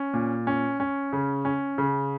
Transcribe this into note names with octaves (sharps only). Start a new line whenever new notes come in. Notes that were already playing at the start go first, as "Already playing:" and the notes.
Already playing: C#4
A#2
C#4
C#4
C#3
C#4
C#3